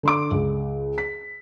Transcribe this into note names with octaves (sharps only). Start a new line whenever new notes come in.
D3 C6 D6
C#2
B6